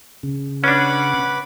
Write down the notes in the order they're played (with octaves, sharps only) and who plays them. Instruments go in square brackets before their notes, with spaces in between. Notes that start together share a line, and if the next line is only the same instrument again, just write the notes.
[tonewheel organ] C#3
[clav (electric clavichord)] C#4 D4 [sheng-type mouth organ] B4 B5 D6 [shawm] F#5